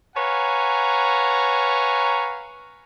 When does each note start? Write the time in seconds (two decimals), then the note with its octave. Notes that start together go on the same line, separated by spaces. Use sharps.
0.16 B4 C#5 F5 F#5 G#5 A#5